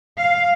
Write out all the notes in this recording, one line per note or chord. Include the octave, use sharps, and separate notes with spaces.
F5